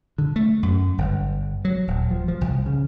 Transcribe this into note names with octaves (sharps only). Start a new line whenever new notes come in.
D3
A3
F#2
G1
F#3
D#1
F3
F3
C2
C#3